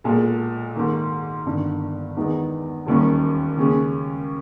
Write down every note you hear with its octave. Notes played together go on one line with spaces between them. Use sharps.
B1 A#2 G#3
G#2 D#3 A#3
G1 G2 D#3
E2 D#3 G#3 B3 D#4
E1 D#2 D#3 G3 C#4
D#2 C#3 G#3 C#4